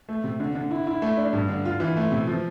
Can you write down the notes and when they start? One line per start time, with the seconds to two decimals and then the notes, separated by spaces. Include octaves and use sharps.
0.09 A3
0.24 C3
0.40 D3
0.55 D3
0.71 E4
0.87 E4
1.02 A3
1.17 D4
1.33 G2
1.49 D3
1.65 F4
1.80 E3
1.97 A3
2.12 C3
2.27 F3